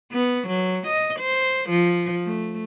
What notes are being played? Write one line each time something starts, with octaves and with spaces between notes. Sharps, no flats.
B3
F#3
D#5
C5
F3
A3